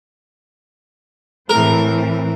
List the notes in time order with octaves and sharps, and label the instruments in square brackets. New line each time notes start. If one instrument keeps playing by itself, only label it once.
[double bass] A2 [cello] E3 C4 [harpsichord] A#4